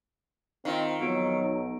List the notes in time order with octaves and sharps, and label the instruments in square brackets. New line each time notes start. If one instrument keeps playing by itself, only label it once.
[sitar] D#3 [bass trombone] C4 [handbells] F4 F5
[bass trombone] F2 [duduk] F#3 [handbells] B3 F#4 D7
[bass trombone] B1